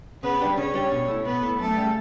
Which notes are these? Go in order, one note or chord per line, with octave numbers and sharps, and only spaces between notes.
C#3 B3 B4
G3 D4 G4
C#3 C#4 C#5
G3 D4 G4
B2
A3 E4
B2 B3 B4
A3 E4
F#2 A3 A4
C#3 G3